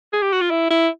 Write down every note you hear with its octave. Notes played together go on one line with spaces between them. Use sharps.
G#4
G4
F#4
F4
E4
E4